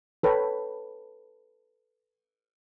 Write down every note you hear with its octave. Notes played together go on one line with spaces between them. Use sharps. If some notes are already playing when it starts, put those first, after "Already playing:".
A4 B4 C#5 G5